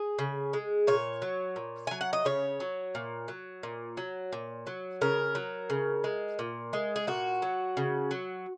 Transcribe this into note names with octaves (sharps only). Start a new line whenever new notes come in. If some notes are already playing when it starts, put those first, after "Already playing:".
Already playing: G#4
C#3
G#3
A#2 C#5
F#3
A#2
F#3 G#5
F#5
D#5
C#3 C#5
F#3
A#2
F#3
A#2
F#3
A#2
F#3
C#3 A#4
F#3
C#3
G#3
A#2
G#3
G#4
A#2 F#4
F#3
C#3
F#3